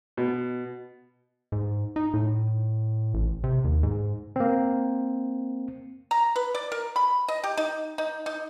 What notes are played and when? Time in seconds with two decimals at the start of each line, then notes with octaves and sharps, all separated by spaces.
0.17 B2
1.52 G#2
1.96 D#4
2.14 A2
3.14 A1
3.44 C3
3.64 D#2
3.83 G#2
4.36 A#3 C4
6.11 A#5
6.36 B4
6.55 D5
6.72 A#4
6.96 B5
7.28 D#5
7.44 G4
7.57 D#4
7.98 D#4
8.26 D#4